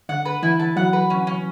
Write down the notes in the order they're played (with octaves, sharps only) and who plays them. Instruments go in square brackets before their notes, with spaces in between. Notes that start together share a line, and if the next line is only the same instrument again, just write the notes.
[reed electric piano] D3 [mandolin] F#5
[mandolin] B4
[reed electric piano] E3 [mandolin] E4
[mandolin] A5
[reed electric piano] F#3 [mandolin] F#5
[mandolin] B4
C#4
C#4